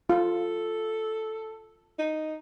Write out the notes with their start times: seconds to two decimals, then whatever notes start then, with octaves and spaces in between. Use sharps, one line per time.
0.10 F4 A4
1.99 D#4